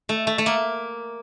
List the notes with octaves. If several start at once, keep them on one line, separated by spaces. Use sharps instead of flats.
A3
A3
A3
A#3